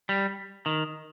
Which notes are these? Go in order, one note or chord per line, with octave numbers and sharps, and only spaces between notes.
G3
D#3